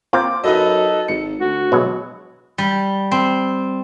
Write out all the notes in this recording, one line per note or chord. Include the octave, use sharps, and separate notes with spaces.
A#3 C4 F4 D6
F#2 D#4 A4 B4 D#5
G#1 C#7
D2 F#4
B2 F#3 G#3
G3
C4